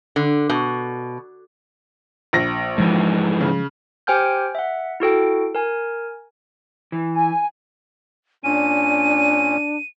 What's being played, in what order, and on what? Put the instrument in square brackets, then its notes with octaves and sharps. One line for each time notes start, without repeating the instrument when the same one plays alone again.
[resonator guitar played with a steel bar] D3
B2
[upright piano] A#1 A#6
[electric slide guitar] G#2 E3 [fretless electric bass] F3 G#3
[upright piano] C#3
[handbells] G4 C5 G5 G#5 F6 G6
E5 F#5
E4 F#4 A4 G5
A#4 G#5
[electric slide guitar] E3
[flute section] G#5
[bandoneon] A#2 C#4 [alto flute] D4 [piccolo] D#7